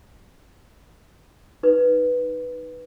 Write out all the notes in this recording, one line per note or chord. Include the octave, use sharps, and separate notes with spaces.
D#4 B4